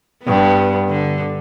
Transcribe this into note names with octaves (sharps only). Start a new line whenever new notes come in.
G2 B3
D3